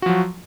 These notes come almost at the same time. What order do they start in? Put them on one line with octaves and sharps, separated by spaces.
F#4 F3 F#3